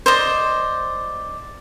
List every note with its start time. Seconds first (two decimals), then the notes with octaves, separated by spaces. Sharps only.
0.06 C5 D5 D#5